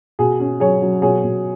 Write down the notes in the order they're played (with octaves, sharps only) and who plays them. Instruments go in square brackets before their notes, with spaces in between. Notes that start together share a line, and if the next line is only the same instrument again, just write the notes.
[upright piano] B2 G#4
C#4
F#3 G#4 C#5
F#3
B2 G#4 C#5
B2